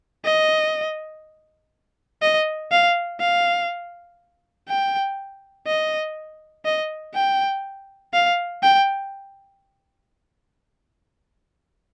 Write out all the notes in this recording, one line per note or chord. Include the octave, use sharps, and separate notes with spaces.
D#5
D#5
F5
F5
G5
D#5
D#5
G5
F5
G5